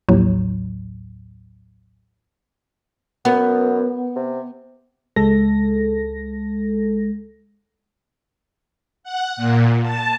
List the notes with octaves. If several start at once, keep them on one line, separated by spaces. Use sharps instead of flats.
A#1 D#2 A2 F#3
F#2 B3
C3
C#2 G#3 A4 A#6
F#5
A#2
A5